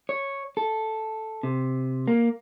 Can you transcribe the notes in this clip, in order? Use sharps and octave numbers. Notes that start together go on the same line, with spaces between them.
C#5
A4
C3
A#3